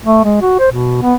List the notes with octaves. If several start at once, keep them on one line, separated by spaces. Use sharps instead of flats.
A3
G#3
F#4
C5
B2
B3